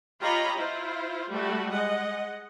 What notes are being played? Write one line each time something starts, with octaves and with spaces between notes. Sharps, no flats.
F4 G4 C#5 D#5 A#5 B5
E4 F4 C5
G3 A3 F#4
G#3 D#5 F#5